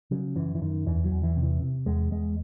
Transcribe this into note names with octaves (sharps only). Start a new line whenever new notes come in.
C#3 F#3
F#2 E3
E3
F#2 D#3
E2 E3
F#3
E2
E3
C3
E3
C3
E2 G#3
E2 G#3